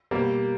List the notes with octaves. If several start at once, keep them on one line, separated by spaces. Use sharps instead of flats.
B2 G3 A#3